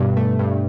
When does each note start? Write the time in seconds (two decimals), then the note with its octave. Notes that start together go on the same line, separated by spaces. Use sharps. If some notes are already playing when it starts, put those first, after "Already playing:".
Already playing: G2 B2
0.17 A3
0.39 G2